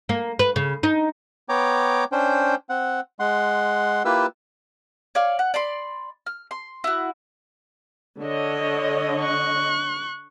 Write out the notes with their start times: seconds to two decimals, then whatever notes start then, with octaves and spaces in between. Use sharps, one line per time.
0.09 A#3
0.39 B4
0.56 C#3
0.83 D#4
1.49 B3 C#5 G5 A#5 D6
2.12 C#4 D4 C5 G5
2.69 C4 F#5
3.20 G#3 F#5 C6
4.05 A#3 E4 F4 G4 B4 E6
5.15 C#5 D5 F5
5.39 F#5
5.54 D5 B5 C6
6.26 F6
6.51 C6
6.84 E4 F#4
8.20 D3 C#5 D#5
9.20 C#6 F#6